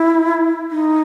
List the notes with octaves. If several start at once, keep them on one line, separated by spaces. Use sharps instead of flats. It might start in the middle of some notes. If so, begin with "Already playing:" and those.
Already playing: E4
D#4